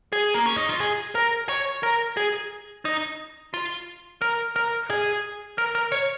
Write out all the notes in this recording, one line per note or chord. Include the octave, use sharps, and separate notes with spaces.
G#4
A#3
C#4
D#4
F4
G#4
A#4
C#5
A#4
G#4
D#4
F4
A#4
A#4
G#4
A#4
A#4
C#5